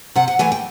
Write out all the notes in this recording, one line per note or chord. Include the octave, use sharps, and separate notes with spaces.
C3 F#5
F#5
E3 A3 G#5
G5